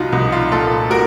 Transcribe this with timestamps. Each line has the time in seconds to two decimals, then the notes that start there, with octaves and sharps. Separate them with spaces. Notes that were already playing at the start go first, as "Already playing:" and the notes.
Already playing: C2 D#4 F4 F#4
0.12 C2 D#4
0.32 F4
0.52 A#2 F4 A4
0.90 A#2 F#4 A#4